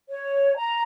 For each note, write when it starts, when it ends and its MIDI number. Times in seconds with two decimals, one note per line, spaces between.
0.09 0.56 73
0.57 0.82 82